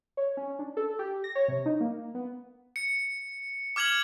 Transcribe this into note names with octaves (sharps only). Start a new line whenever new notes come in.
C#5
C#4
D4
A4
G4
A#6
C#5
C3
D#4
A#3
B3
C#7
D6 F6 G#6 F7 F#7